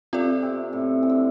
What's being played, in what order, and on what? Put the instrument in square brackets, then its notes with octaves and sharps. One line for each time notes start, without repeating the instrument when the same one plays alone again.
[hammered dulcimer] C3 [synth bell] C4 F4 A4 D5
[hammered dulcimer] C3
A2
C3
D3